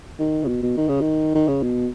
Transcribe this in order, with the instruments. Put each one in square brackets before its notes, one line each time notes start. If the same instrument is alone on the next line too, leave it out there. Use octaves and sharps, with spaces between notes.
[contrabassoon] D#3
C#3
B2
B2
D#3
C#3
D#3
D#3
C#3
B2